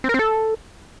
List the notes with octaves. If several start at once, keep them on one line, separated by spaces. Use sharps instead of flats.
C4
A#4
C4
A4